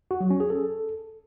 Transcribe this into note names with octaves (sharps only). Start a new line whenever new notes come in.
F#4
F#3
C#4
G#4
A4